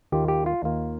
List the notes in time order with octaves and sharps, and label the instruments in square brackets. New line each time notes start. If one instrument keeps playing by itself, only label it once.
[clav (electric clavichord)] D#2 D#3 A#3 F4 G4
G4
F4
D#2 D#3 A#3 F4